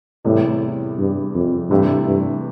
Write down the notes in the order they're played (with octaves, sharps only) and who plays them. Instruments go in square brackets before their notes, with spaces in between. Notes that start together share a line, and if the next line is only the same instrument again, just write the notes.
[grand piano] E2 C3 E3 G3 [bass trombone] A2
[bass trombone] G2
F2
[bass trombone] G2 [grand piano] C3 E3 A3
[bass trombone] G2